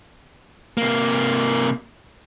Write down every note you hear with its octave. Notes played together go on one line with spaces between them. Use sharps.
C3 A#3